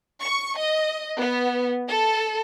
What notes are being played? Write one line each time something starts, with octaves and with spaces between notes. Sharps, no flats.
C#6
D#5
B3
A4